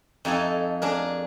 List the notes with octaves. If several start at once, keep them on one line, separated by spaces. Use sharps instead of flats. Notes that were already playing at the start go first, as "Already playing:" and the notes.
F2 D#4 A4 G#5
D4 G#4 A#4